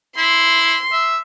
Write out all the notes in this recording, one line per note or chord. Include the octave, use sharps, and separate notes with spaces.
E4 C6
E5